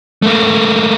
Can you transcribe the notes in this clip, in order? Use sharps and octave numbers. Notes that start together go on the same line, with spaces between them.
A3 A#3